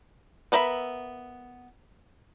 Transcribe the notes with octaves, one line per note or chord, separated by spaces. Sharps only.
B3 D4 A#4 E5 B5